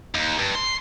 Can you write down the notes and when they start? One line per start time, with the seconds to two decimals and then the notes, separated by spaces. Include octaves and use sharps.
0.15 D#2
0.39 G2
0.55 C6